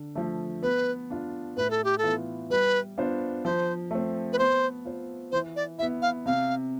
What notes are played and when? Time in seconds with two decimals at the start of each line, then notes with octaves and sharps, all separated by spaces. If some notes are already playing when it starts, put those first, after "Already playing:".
Already playing: D3
0.16 F3 A3
0.63 B3 B4
1.10 D4 F4
1.57 A2 B4
1.70 A4
1.84 G4
1.98 A4
2.03 E3 B3 F4 B4
2.50 G3 B4
2.98 B3 D4 F4 C5
3.45 F3 C5
3.91 A3 C4
4.33 B4
4.38 B3 C5
4.85 F4 C5
5.32 E3 C5
5.56 D5
5.79 E4 E5
5.82 B3
6.02 F5
6.26 C3 F5